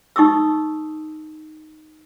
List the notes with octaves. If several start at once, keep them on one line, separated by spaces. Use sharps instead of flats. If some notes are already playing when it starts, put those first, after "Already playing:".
D#4 C#6 D#6 E6